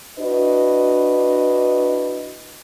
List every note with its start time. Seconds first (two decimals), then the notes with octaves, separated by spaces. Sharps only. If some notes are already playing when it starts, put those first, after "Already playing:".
0.19 D4 E4 F#4 B4 D#5